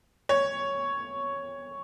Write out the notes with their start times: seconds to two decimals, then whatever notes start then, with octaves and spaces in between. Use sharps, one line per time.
0.29 C#5